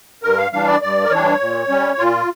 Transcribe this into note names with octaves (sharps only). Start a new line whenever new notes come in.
G2 A#4
F5
E3 G3 D4 F5
D5
G2 D5
A#4
E3 G3 D4 C#5
A#2
G3 C#4
A#2 F4